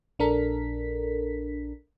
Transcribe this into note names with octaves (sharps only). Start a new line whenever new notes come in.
A#1 D4 A4 A#4 B6